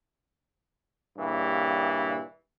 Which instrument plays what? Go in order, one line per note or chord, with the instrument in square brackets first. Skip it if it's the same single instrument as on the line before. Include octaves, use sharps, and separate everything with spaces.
[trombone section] G2 A#2 C#3 E3 G3